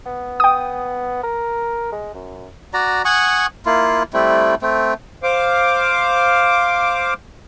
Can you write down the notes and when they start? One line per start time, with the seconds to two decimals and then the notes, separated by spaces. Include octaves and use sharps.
0.06 B3
0.40 G5 D#6
1.23 A#4
1.92 G#3
2.14 F#2
2.74 F#4 D5 A#5
3.05 F#5 G#5 C#6 D#6
3.66 A#3 E4 F4
4.13 G3 A3 C4 E4
4.62 A3 C4
5.23 C5 F5 D6